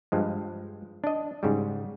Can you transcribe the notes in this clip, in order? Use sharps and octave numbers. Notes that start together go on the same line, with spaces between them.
G2 F3 G#3
D4 D#5
G#2 C#3 G3